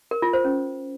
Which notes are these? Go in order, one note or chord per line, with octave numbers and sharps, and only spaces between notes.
A#4
F4
C5
C#4